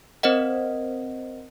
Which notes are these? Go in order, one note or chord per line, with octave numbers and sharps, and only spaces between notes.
C4 A#4 C5 D#5 F#5